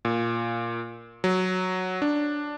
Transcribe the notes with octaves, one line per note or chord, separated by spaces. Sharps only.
A#2
F#3
D4